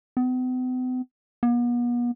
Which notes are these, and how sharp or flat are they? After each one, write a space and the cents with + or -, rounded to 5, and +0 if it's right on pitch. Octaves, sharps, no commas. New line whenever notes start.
B3 +45
B3 -40